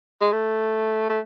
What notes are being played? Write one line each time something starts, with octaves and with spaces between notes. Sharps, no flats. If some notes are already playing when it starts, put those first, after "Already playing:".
G#3
A3
A3